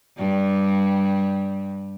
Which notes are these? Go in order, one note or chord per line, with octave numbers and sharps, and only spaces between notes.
G2 G3